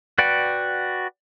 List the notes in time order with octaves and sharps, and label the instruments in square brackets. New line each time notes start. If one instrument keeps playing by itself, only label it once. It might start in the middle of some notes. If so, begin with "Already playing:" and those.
[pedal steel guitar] F#4 B4 D5 F#5 G5